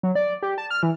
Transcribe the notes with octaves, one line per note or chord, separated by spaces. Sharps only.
F#3
D5
G4
A5
F6
E3